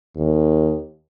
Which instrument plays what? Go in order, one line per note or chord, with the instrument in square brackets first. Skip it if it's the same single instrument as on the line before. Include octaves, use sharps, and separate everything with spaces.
[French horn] D#2